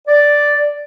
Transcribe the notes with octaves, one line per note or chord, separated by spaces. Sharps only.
D5